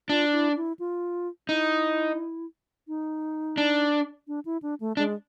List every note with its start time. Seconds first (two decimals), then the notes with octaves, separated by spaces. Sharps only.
0.09 D4 F4
0.32 E4
0.56 E4
0.79 F4
1.48 D#4 E4
2.88 D#4
3.58 D4
4.28 D4
4.45 E4
4.62 D4
4.80 A3
4.97 G#3 D4